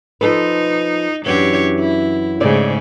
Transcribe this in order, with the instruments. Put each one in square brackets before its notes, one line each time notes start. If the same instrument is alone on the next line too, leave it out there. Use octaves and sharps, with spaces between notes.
[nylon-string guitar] F3 A4 B4 [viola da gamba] D#4
[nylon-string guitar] F#2 E3 [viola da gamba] D4 G4 C#5
[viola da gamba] E4
[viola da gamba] G#2 C#3 A3 [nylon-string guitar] C4 E4 D5